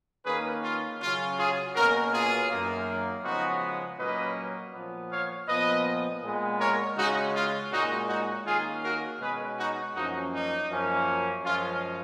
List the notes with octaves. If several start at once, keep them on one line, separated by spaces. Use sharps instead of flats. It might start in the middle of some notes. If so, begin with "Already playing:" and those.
D#3 A#3 C#4 G#4 B4
F4
C#3 F#3 C#4 F4
F4 G#4
B2 A#3 C#4 F#4 A#4
F4 G#4
F#2 D#3 A#3
C#3 F3 G#3 B3 D#4 F#4
A#2 F#3 A#3 C#4 B4 D#5
A#2 F3 B3
C#5 F5
A#2 F3 B3 B4 D#5
A#2 G#3 B3
A#4 C#5
C#3 G#3 C#4 D#4 F#4
F4
A#2 G#3 C#4 D#4 F#4
D#4 F#4
D#3 A#3 C#4 F4 G#4
F#4 A#4
B2 G#3 C#4 G#4 B4
D#4 F#4
F#2 F3 A#3 C#4 D#4 F#4
D#4
F#2 F3 A#3 C#4
F#2 F3 G#3 C#4 F4